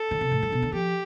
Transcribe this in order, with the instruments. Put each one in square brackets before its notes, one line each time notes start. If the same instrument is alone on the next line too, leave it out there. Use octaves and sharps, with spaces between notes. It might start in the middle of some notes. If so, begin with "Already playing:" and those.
Already playing: [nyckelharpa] A4
[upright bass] D3
C3
A2
G2
B2
D3
[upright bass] F3 [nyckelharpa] G4